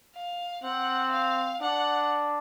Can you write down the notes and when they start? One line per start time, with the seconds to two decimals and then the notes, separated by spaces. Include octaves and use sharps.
0.15 F5
0.64 C4 F#5
1.12 F5
1.61 D4 F#5